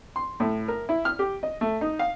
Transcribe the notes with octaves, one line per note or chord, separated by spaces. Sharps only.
C6
A2
A#4
E4
F6
G4
D#5
A3
D#4
F5